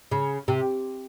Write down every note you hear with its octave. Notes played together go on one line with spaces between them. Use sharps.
C#3
C3